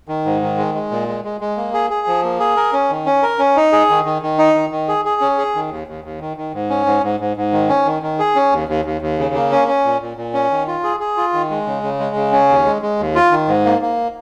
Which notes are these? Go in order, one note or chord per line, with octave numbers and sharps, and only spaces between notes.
D#3
G#2
D#3
G#3
G#3
A#2
G#3
G#3
G#3
A#3
G#4
G#4
F3
A#3
G#4
A#4
C#4
D#3
C#4
A#4
C#4
D#4
G#4
D#3
D#3
D#3
D#4
D#3
D#3
G#4
G#4
C#4
G#4
D#3
D#2
D#2
D#2
D#3
D#3
G#2
C#4
G#2
G#2
G#2
G#2
D#3
C#4
D#3
D#3
G#4
C#4
D#2
D#2
D#2
D#2
C#3
A#3
C#4
C#4
A#2
A#2
A#2
C#4
D#3
F4
G#4
G#4
F4
D#3
G#3
C#3
C#3
G#3
C#3
C#4
D#2
G#3
G#3
D#2
F4
D#3
G#2
A#3
A#3